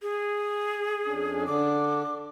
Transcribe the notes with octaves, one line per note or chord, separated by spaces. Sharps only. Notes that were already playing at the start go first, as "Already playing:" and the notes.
G#4
F2 C#4 D4
D3 D4 D6